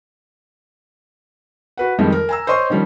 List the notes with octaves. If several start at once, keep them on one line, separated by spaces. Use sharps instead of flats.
F#4 B4 F#5
F2 D#3 F3 G3 G#3
A#4
G#5 A#5 E6
C5 C#5 D#5 C6 C#6
D#3 F3 G3 C#4